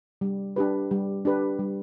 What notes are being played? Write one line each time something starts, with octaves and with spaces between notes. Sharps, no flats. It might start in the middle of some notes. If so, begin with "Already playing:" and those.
G3
D4 G4 B4
G3
D4 G4 B4
G3